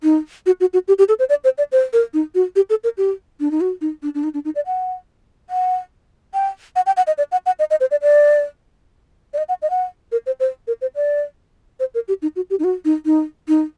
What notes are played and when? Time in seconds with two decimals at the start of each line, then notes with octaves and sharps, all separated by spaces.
0.03 D#4
0.46 F#4
0.60 F#4
0.73 F#4
0.88 G4
0.98 G4
1.09 A4
1.19 C5
1.29 D5
1.44 C5
1.58 D5
1.72 C5
1.93 A#4
2.14 D#4
2.35 F#4
2.56 G4
2.70 A4
2.84 A#4
2.98 G4
3.40 D4
3.51 D#4
3.61 F#4
3.81 D#4
4.03 D4
4.15 D4
4.24 D#4
4.34 D4
4.45 D#4
4.55 D5
4.66 F#5
5.50 F#5
6.34 G5
6.76 F#5
6.86 G5
6.97 F#5
7.07 D#5
7.18 D5
7.32 F#5
7.46 F#5
7.59 D#5
7.71 D#5
7.81 C5
7.91 D5
8.02 D5
9.34 D5
9.38 D#5
9.49 F#5
9.62 D#5
9.70 F#5
10.12 A#4
10.26 C5
10.40 C5
10.67 A#4
10.81 C5
10.96 D5
11.80 C5
11.94 A#4
12.08 G4
12.22 D#4
12.36 F#4
12.50 G4
12.59 D#4
12.64 F#4
12.85 D#4
13.06 D#4
13.48 D#4